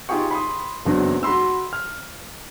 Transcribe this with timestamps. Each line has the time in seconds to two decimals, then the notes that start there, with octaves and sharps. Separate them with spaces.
0.09 D#4 F4 G4 G#4 G5 C#6
0.31 B5 C6 D#6
0.85 F#1 E2 F#3 C4 D4
1.23 F#4 B5 C6 E6
1.73 F6